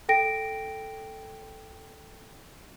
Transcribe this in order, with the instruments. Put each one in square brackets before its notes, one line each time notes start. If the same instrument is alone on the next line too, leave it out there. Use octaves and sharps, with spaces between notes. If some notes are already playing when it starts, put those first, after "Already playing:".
[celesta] A4 G5 A#6 D7